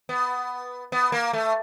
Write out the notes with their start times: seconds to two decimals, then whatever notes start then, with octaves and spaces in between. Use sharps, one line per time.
0.09 B3
0.92 B3
1.12 A#3
1.33 A3